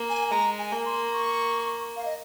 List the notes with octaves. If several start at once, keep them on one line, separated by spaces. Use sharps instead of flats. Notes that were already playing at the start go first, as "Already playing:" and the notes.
Already playing: A#3
G#5
G#3 A#5
G#5
A#3
C6
C#6
F5
D#5